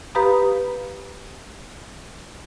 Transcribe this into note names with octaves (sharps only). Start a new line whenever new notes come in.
G4 B4 F5 A#5 B5 D#6